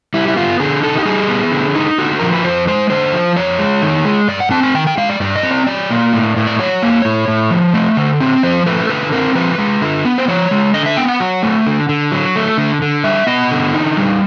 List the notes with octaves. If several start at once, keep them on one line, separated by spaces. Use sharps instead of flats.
G3 E4
E4
B3 F4
D3 G#4
D#4 A4
G4
G3 G#4
B3
D3
D#4
D3 F#4
F3 A#4
B4
F2 C5
G#3 C5
D3 C5
F3
F2 C#5
G#3
D#3
G#3
G2 D5
F#5
C4 A5
G#5
D#3 G5
G5
G#3 F5
D5
G2 D5
D#5
C4
D5
F#3 D5
A#3
A2
A2
D5
F#3 C#5
A#3
A2
A2
F3
A3
D3
C4
F3 C5
A3 B4
D3 B4
C4 A#4
F3 B4
G#3
D3
B3
C5
F3 C#5
G#3
D3 D#5
E5
B3 G5
F#5
F#3
A3
D3
D3
F#3
A3
D3
D3
G3 E5
B3 D#5
D3
D#4
G3